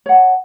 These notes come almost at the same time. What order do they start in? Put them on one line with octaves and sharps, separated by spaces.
C#5 F#5 A5